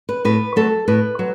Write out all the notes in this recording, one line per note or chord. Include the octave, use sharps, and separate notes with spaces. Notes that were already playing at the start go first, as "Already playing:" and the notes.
B4
A2 B4
F#3 A3 A4
A2 B4
F#3